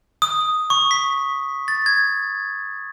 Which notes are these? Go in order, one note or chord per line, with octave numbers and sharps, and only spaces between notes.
D#6
C#6
B6
A6
G#6